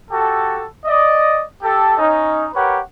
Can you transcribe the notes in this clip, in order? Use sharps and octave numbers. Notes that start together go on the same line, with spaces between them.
F#4 G4 A4
D5 D#5
G4 A4
C#4 D#4
G4 A#4 B4 C#5 F#5